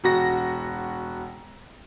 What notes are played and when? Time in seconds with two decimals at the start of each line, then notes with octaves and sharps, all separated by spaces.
0.04 E1 F#4 A#6